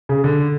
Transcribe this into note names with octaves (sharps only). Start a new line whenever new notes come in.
C#3
D3